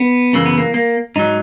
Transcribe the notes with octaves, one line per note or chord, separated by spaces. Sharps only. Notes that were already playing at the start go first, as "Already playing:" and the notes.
Already playing: B3
F#2 C#3 E3 A#3
B3
A#3
A#3
G#2 F#3 D#4